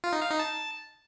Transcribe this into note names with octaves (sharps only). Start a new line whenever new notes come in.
F4
D#4
F5
D#4
A5